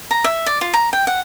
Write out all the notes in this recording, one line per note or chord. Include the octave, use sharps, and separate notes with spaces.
A#5
E5
D5
F4
A#5
G5
F#5